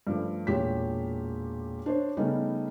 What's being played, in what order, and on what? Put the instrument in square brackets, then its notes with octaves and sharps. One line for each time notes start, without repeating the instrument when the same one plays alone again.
[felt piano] G2 F3 A3
E1 A#2 G4 C#5 B6
D4 C5 C#5
C#3 G3 A3 B3 C#4 D#4